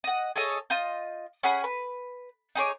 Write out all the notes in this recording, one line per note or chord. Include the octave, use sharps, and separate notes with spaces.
D#5 F#5
G#4 A4 C#5 D#5
F4 D#5 G6
C#4 G#4 F#5 B5
B4
D#4 G#4 C#5 D6